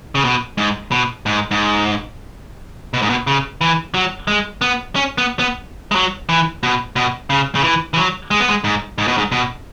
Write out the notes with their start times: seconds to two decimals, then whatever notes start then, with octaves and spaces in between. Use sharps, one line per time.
0.15 C#3
0.24 B2
0.58 G#2
0.92 B2
1.26 G#2
1.51 G#2
2.94 B2
3.02 G#2
3.10 B2
3.27 C#3
3.61 E3
3.94 F#3
4.28 G#3
4.61 B3
4.96 C#4
5.18 B3
5.39 B3
5.91 G#3
5.95 F#3
6.29 E3
6.63 B2
6.96 B2
7.30 C#3
7.55 C#3
7.64 E3
7.94 E3
7.97 F#3
8.31 G#3
8.40 B3
8.49 G#3
8.64 G#2
8.98 G#2
9.08 B2
9.17 G#2
9.32 B2